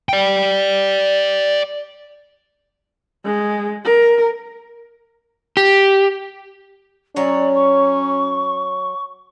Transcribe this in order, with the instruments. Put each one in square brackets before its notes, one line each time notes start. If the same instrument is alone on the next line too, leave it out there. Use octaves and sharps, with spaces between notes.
[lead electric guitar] D5 G5
[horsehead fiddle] G#3
A#4
[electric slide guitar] G4
[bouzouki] F#3 C#5 [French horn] C#4 [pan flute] D5
[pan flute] C#6